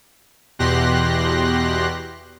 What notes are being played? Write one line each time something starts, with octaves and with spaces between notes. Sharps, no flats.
E2 B2 G4 C6 F#6 A#6